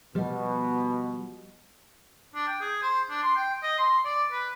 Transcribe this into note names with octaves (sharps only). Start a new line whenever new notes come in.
B2 F3 G3
D4
G5
G#4
C5
D4
C6
G5
D#5
C6
D5
B4